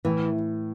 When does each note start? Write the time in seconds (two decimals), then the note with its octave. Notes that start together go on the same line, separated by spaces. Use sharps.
0.05 A2 E3